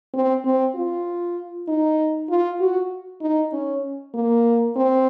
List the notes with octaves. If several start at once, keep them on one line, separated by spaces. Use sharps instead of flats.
C4
C4
F4
D#4
F4
F#4
D#4
C#4
A#3
C4